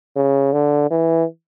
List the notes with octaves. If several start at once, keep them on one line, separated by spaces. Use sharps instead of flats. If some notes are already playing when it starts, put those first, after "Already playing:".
C#3
D3
E3